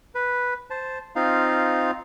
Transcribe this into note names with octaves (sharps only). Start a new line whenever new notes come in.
B4
C5 A5
C4 D#4 F4 F5